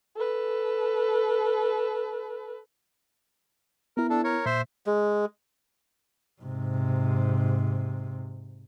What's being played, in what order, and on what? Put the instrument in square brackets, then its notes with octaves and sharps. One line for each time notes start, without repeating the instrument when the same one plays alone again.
[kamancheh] A4 B4
[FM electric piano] B3 E4 [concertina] A#4
[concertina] D4 A4
A#4 C#5
[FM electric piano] A#2 [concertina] C5 E5 C6
[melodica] G#3
[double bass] G#2 C3